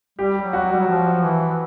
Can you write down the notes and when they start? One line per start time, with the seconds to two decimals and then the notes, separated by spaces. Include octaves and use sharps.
0.19 G3 G4
0.42 F#3
0.53 F#4
0.64 F#3
0.72 G3
0.79 F#3
0.87 F3
1.22 E3